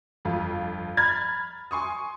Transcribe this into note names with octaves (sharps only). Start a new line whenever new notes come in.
G1 F2 F4
A#5 B5 F6 G#6 A6
G#5 C6 C#6 D#6